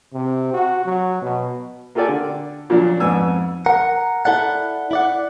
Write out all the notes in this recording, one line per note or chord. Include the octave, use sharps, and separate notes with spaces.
C3
F#4
F#3
B2
A#3 F4 G4 A4 D5 G#5
D3
A#2 F3 F#3 D4
F2 G#2 B3 G#5 E6
A#4 F#5
E4 A4 D5 F#5
E4 D5 F#5